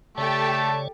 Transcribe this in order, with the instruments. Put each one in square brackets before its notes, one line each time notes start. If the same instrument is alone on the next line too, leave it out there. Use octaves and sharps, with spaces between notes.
[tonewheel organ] C#3 C#5 D5 [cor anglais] A3 [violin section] G4 A4 [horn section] A5